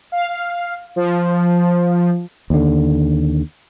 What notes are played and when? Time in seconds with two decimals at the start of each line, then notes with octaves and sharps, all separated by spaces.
0.12 F5
0.96 F3
2.50 D#2 D3